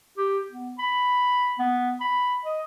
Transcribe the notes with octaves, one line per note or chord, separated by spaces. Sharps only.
G4
B3
B5
B3
B5
D#5